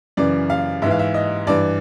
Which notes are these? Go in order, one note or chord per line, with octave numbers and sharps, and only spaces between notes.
F#2 C#3 E3 D5
F5
G#2 E3 E5 F5
E5
D#5
G2 E3 D5